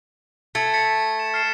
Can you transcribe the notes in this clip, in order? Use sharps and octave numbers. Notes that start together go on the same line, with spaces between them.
A3 G#6 A6 C#7
A6 B6 C#7
E7
F6 C7 E7